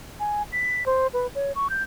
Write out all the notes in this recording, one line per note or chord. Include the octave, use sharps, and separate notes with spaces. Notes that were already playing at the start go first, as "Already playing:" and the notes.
G#5
B6
C5
B4
C#5
C#6
G6